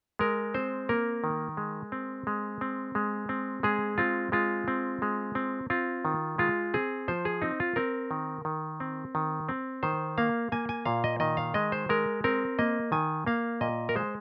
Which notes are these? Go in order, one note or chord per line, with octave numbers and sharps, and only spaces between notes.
G#3 A#4
C4 C5
A#3 A#4
D#3
G#3
C4
G#3
C4
G#3
C4
G#3 G#4
C4 F4
G#3 F4
C4
G#3
C4
C4 F4
D#3
G#3 F4
C4 G#4
F3 C5
G#4
C4 D#4
F4
C4 A#4
D#3
D#3
C4
D#3
C4
D#3 C5
A#3 F5
A#3 G#5
G#5
A#2 F5
D#5
D#3 D#5
F5
G#3 D#5
C5
G#3 A#4
C4 A#4
A#3 D#5
D#3 G#5
A#3 F5
A#2 D#5
A#4
G#3 C5